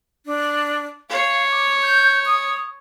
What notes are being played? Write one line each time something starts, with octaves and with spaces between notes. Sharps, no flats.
D4
C#5 F5
D6
G6
D#6